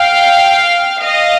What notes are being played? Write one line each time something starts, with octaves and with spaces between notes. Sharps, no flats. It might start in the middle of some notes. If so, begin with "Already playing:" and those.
Already playing: F5 G5
D#5 F5